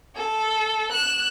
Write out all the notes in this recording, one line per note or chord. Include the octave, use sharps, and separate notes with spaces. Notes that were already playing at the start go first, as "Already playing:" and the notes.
A4
F#6 E7